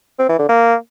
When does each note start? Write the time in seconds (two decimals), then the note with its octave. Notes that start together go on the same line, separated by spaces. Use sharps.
0.19 C4
0.29 E3
0.39 D3
0.49 A#3